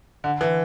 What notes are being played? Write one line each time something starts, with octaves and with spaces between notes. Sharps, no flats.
D3
E3